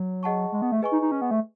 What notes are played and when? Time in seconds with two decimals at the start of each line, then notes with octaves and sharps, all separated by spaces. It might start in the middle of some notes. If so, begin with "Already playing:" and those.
Already playing: F#3
0.23 G#4 D#5 F#5 A5 C#6
0.52 G#3
0.62 B3
0.72 A3
0.82 G#4 B4 D#5 G#5 C#6
0.92 D#4
1.02 D#4
1.12 C#4
1.22 B3
1.31 A3